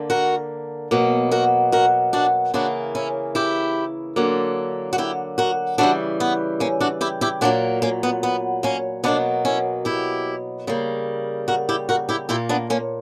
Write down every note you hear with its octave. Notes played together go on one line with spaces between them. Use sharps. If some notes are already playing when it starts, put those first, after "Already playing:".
Already playing: D3 A#3
F#4 A#4
B2 F#3 A#3
F#4 A#4
F#4 A#4
D4 F#4
C#3 E3 A#3 D4 F#4
C#4 E4
E4 G4
D3 F#3 A#3
F#4
E4 G4
F#4 A#4
C#3 E3 G3 D4 F#4
B3
A#3 C#4
D4 F#4
E4 G4
E4 G4
A#2 F#3 A#3 D4 F#4
A#3 C#4
B3
B3
A#3 C#4
B2 F#3 A#3 B3 D4
C#4 E4
E4 G4
C#3 G3 A#3
F#4 A#4
E4 G4
F#4 A#4
E4 G4
A#2 A#3 E4 G4
B3 D4
A#3 C#4